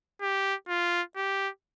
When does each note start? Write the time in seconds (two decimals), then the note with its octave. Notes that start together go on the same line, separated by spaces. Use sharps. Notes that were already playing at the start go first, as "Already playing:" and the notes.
0.21 G4
0.69 F4
1.16 G4